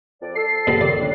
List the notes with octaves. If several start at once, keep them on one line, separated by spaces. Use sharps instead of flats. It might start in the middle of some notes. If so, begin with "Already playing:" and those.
F2 D5
A4 C7
A#2 F3 G3
D#3 D5
G3 C#4 D4